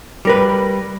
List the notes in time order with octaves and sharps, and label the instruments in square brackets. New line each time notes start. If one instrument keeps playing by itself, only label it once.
[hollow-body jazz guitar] G3 A#4 B4